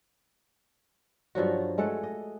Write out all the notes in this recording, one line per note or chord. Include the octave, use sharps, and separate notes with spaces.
G2 F3 F#3 F#4
G#3 A3 A4 F#5
D#5